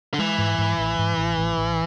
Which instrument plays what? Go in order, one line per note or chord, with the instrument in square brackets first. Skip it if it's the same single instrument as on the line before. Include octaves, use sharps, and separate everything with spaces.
[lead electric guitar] D3
[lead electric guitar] E3 [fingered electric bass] G#3
[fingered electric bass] G#2
G#2
A1
G#2
A1
A1
A1